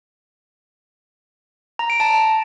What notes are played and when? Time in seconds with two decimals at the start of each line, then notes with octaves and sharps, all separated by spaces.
1.79 A#5
1.90 D7
2.00 A5